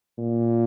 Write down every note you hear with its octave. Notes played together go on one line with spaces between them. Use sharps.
A#2